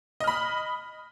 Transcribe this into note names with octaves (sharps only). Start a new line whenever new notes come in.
D#5 B5 F6